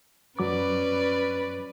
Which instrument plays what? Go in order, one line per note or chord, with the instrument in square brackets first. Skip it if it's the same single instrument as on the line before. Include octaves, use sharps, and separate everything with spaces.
[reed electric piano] F#2 F#3 D6 [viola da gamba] C#4 B4 D5